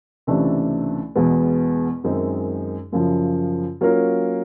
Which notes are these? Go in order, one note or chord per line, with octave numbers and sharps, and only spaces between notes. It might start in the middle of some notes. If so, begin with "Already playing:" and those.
C#2 C3 E3 A3 D4
E2 B2 G#3 B3
F#2 D#3 G#3 C4 D#4
F#2 C#3 F3
F#3 A#3 C#4 F4 A#4